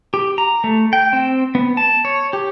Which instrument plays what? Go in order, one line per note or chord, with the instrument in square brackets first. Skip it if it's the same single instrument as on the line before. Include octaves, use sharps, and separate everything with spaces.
[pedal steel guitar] G4
A#5
A3
G5
C4
B3
A5
C#5
G4